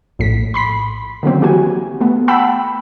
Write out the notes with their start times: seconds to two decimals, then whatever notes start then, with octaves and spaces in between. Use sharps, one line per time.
0.19 A#1 A2 B6
0.54 B5 C6 B6
1.23 D3 D#3 F#3 A#3 C4
1.41 E3 F#4 G4 G#5
2.01 A3 B3
2.28 F#5 G5 A5 B5 E6